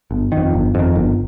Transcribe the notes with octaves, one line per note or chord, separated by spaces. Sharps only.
G1
D#3
F2
G1
F2 D#3
G1